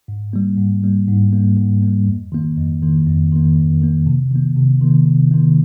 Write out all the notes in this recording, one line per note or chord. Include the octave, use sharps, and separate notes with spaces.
G#2
G3 A#3
G#2
G3 A#3
G#2
G3 A#3
G#2
G3 A#3
F2
D#3 A#3
F2
D#3 A#3
F2
D#3 A#3
F2
D#3 A#3
C3
D#3 A#3
C3
D#3 A#3
C3
D#3 A#3